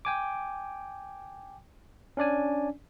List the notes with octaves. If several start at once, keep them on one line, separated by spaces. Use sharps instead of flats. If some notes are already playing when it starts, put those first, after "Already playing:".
G5 G#5 D6
C#4 D4 D5 G#5